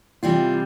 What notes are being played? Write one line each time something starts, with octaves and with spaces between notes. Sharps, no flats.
C3 E3 G3 F4